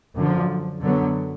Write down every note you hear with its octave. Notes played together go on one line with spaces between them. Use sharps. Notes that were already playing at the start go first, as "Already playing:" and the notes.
F#2 D3 F3
F#2 D3 F#3 B3